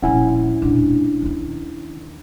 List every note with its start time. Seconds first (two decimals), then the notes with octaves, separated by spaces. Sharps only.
0.02 D#1 A#1 C#4 E4 F#5 G#5
0.62 E1 A#2 D4
1.22 D#2 D#3